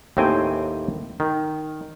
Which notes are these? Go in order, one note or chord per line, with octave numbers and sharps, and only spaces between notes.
D#2 A2 C4 G5 G#5
D#3